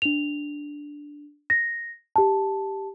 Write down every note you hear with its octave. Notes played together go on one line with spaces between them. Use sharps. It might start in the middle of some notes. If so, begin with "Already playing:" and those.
D4 F7
A#6
G4 A5